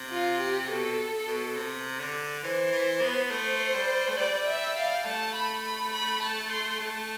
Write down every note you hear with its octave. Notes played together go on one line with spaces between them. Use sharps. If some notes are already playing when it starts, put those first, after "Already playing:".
Already playing: C3
F4
G4
B2 A4
B2
C3
D3
E3 C5
E3
B3
A3 C5
G3
A3
G3 D5
E5
F5
A3 A5
B5
B5
B5
A5
C6
A3 A5